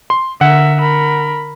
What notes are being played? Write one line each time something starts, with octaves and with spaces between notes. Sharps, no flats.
C6
D3 A#4 E5 F#5
A#4 B5